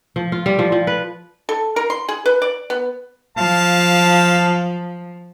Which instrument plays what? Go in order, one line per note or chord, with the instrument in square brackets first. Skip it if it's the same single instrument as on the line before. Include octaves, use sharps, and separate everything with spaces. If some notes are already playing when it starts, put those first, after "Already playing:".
[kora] F3
F4
G3
F3
F3
B4
[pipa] A4
A#4
C6
G#4
B4
D5
B3
[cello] F3 [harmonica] F5 A5